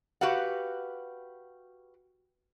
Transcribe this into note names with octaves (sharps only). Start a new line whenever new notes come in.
F#4 G4 B4 F5 F#5